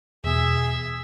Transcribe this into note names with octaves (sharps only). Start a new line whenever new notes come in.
E2 B2 G#4 E5